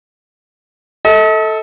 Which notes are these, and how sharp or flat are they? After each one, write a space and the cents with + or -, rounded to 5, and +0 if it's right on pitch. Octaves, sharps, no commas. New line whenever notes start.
A4 +0 D#5 +45